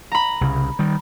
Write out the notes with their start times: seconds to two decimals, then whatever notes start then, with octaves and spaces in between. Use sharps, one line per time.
0.12 A#5 B5
0.41 C2 C#3
0.79 D#3 G3